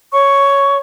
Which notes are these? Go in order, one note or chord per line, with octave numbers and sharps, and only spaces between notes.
C#5 C#6